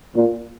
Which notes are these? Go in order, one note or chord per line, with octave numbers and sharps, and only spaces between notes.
A#2